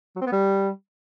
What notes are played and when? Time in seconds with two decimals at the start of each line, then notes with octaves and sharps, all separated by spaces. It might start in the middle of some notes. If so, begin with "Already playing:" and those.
0.16 F#3
0.21 C4
0.27 B3
0.32 G3